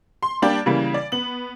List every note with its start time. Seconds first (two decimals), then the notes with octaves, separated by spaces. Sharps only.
0.23 C6
0.42 G3 A#3 D4 G4
0.66 C#3 E3 G3 A#3
0.94 D5
1.12 B3 F#7